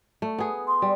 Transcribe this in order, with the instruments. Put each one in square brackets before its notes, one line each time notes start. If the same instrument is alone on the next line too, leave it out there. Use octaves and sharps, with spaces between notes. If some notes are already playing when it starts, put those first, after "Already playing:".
[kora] A3
B3 G#4
[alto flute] C6
[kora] G3